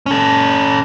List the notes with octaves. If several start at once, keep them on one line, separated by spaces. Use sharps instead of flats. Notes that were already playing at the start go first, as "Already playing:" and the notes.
C#4 A4